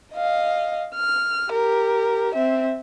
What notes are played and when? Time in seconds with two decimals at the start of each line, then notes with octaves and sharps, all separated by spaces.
0.13 D#5 F5
0.95 F6
1.50 G4 A#4
2.35 C4 E5